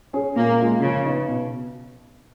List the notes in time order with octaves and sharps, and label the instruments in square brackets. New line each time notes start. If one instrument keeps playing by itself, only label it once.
[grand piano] C#4 G#4 C#5
[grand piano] A#2 [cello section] A#3
[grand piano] G#3 C#4 F4
[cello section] C#3 [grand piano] F3
[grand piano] B3 D#4
B2